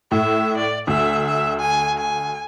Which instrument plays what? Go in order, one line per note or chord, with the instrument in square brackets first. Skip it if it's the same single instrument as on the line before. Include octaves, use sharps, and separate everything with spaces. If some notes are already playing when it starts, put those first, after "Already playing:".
[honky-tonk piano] A2 [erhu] E5
[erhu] D5
[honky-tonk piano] D2 [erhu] E5
[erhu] E5
G#5
G#5